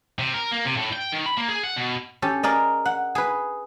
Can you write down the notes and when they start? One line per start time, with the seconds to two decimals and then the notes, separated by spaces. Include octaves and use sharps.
0.19 C3
0.34 A#4
0.51 A#3
0.65 C3
0.76 A2
0.92 G5
1.12 D#3
1.26 B5
1.37 A#3
1.49 G#4
1.64 F#5
1.76 B2
2.22 C#4 G4 A4
2.43 G#4 A#4 D5 D#5
2.85 F#5
3.15 G#4 B4